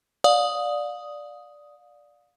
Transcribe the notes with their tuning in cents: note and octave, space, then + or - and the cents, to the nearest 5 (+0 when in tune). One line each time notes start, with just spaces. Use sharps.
D5 +0 F5 +30 D#6 +5